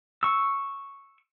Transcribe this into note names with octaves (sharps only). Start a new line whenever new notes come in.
C#6 E6